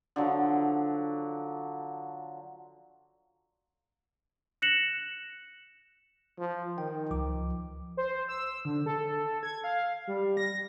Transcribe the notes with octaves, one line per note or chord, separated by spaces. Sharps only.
D3 F3 F#3
F#6 A#6 C#7 E7 F#7
F3
D#3 G5
C#2 F3 D6
C5
E6
D3
A4
G#6
F5
G3
A#6